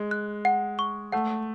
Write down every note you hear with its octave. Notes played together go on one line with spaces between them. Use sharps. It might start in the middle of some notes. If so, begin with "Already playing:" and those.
Already playing: G#3
F#6
F#5
C#6
A3 F#5